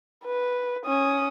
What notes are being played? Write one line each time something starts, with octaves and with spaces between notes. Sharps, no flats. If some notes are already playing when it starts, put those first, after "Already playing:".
B4
C#4 D#6